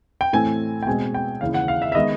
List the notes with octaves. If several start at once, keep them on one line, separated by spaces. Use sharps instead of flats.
G5
A2 E3 A3 C4 G#5
G5
B2 G#3 C4 G#5
G5
D#2 C#3 E3 F5
F#5
F5
E5
E5
D#3 G#3 B3 D#5